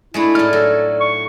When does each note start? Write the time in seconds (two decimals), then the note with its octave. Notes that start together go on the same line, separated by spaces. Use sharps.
0.14 G#3 A3 D4 E4
0.35 A2 D#4 D5 F6
0.53 F#3 A4
1.00 C#6